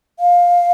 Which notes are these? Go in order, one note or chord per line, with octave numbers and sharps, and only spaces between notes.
F5